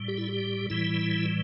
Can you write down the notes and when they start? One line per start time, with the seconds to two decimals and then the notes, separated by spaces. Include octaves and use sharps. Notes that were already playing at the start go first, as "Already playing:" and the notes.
Already playing: A2 G3
0.08 G4
0.17 E4
0.28 G4
0.70 A2 E3 G3 E4